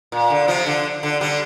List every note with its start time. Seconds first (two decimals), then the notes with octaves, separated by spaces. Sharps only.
0.12 A#2
0.30 D3
0.48 C3 F3
0.66 D3
1.03 D3
1.21 D3 G3